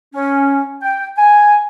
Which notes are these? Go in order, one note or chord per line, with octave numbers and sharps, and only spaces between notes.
C#4
G5
G#5